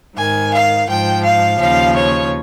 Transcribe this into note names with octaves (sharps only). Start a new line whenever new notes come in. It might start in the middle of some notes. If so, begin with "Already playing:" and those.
G#2 D#3 G#5
F5
G#2 F3 G5
F5
D#2 C#3 F3 F5
C#5